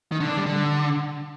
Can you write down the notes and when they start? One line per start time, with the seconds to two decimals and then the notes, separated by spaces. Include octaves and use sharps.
0.12 D#3
0.20 D3
0.29 D4
0.37 G3
0.46 D3